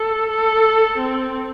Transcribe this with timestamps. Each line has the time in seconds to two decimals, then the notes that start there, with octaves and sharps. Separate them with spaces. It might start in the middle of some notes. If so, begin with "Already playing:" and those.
Already playing: A4
0.30 A4
0.98 C4